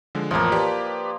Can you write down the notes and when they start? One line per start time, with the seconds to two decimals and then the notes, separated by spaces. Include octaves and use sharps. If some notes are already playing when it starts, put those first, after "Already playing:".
0.15 D3 F3 G#3
0.31 A1 F2 F3 A#3
0.52 G4 B4 D5